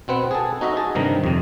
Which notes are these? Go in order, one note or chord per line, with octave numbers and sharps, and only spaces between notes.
B2 C4 B4 F#5
G#4 A4
D#4 F#4 D#5 E5
G#4 A5
G2 C3 D#3 A#5
F2 C3